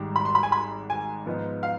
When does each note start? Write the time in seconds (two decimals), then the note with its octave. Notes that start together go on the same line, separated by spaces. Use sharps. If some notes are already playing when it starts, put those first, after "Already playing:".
Already playing: G#1 G#2 G3
0.16 B5
0.25 C6
0.35 B5
0.43 G#5
0.52 B5
0.90 G#5
1.26 G#2 F3 B3 D#4
1.63 F5